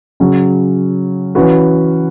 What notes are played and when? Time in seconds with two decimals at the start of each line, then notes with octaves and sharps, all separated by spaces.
0.20 C#3 F#3 C#4
1.35 E3 C#4 F#4 B4